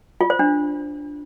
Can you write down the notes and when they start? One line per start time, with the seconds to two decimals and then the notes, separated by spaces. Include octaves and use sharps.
0.21 F4
0.30 C5
0.39 D4